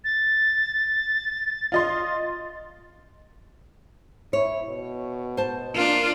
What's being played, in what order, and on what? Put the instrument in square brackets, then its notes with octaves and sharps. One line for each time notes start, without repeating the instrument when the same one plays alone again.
[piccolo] A6
[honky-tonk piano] F4 D#5 C6
[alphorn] E4 [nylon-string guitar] C#5
[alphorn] B2
[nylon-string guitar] C5 A5
[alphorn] A#3 [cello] D4 F4